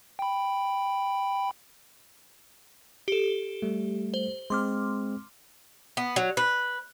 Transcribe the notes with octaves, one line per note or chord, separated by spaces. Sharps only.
G5 B5
G4 A4
G3 A3
C5
G#3 C4 C6 D6 F6
B3
F#3
B4